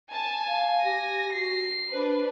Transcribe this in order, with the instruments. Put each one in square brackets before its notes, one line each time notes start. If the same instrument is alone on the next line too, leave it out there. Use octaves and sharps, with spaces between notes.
[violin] G#5 [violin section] A5
[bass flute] F5
[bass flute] G4 [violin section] A#6
[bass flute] F#4 [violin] C7
[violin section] D4 B4 [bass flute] C5